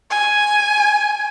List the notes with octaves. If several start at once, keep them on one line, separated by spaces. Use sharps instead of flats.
G#5